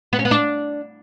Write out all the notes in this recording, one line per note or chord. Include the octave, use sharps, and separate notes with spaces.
B3
C#4
B3
D4